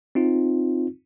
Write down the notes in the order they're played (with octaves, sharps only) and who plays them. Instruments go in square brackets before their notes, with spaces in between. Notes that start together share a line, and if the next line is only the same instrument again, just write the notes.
[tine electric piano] C4 D#4 F4